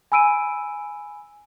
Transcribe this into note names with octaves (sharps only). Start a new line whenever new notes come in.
G#5 B5 E6 D7 D#7